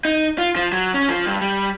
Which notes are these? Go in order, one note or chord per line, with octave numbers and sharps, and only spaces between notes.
D#4
F4
F3
F#3
C#4
F3
G2
G3